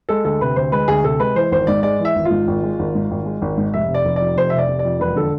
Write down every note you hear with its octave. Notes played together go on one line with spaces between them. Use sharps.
G#3 A4
D2 A4
C3 B4
D2 C5
G#3 B4
D2 G#4
C3 A4
G#3 B4
E3 C5
G#1 C5
G#2 D5
G#3 D5
E3
E5
G#1
F4
G#2
G#1
G#3
G#1
G#2
G#1
G#3
G#1
G#2
F1 E5
C3
D5
F1
F2 D5
F1 C5
E5
C3
D5
F1
D5
F2
E1 B4
D3 A4